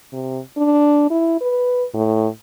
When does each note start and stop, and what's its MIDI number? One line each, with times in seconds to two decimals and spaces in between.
0.13 0.40 48
0.57 1.08 62
1.10 1.37 64
1.41 1.85 71
1.94 2.28 45